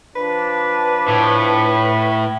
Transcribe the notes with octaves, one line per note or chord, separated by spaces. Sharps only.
F3 D4 B4
A2